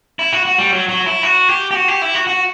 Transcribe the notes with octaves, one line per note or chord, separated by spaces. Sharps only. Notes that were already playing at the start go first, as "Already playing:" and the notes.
E4
F#4
F#4
G3
F#3
F#3
E4
F#4
G4
G4
F#4
G4
E4
F#4
F#4